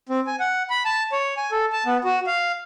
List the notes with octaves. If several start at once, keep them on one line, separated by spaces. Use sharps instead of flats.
C4
G#5
F#5
B5
A5
C#5
G#5
A4
A5
B3
F#4
F5